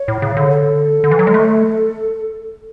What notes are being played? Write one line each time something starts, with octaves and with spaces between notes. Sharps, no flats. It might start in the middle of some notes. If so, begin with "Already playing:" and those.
Already playing: C#5
A2
C#3
D3
A4
D3
E3
F#3
G#3
A3